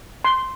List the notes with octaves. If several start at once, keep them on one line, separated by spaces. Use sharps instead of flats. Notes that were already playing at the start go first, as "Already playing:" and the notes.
C6